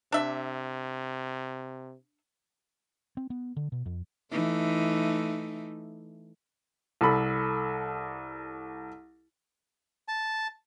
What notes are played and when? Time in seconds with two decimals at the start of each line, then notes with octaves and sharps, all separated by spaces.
0.12 C3 D4 E5
3.17 C4
3.30 B3
3.56 D3
3.72 B2
3.86 F2
4.32 E3 A3 D#4
7.01 C2 A4 B5
10.08 A5